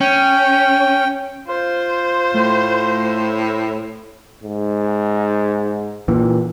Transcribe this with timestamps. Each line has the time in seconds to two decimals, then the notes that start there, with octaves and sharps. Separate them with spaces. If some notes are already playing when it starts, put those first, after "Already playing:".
0.01 C#4 G5
1.48 F4 C5
2.34 A2 A3
4.43 G#2
6.08 A#2 E3